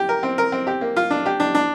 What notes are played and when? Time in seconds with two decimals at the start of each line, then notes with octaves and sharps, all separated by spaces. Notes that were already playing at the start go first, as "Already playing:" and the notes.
Already playing: G4
0.09 A#4
0.23 C4
0.38 A#4
0.52 C4
0.67 G4
0.81 A#3
0.96 F4
1.10 D4
1.26 G4
1.40 D4
1.55 D4